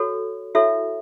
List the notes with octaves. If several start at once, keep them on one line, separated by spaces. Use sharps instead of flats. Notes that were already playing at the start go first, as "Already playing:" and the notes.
Already playing: F#4 A4 C#5
E4 F#4 A4 C#5 E5